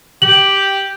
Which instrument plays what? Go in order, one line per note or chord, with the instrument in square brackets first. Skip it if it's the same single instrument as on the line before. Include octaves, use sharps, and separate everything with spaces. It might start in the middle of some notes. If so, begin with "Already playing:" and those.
[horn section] G4 [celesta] F#7